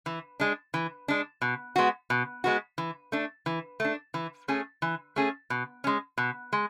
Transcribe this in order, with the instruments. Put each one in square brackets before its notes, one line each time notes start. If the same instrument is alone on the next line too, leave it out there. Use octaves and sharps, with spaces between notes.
[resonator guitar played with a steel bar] E3
G#3 D4
E3
G#3 D4
B2
G#3 B3 F#4
B2
G#3 B3 F#4
E3
A3 D4
E3
A3 D4
E3
A3 C#4 G#4
E3
A3 C#4 G#4
B2
G#3 C#4
B2
G#3